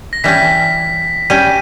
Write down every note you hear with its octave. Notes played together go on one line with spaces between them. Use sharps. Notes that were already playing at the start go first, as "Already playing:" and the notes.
A#6
E3 G3 C#4 B6
G3 C#4 G4 D#7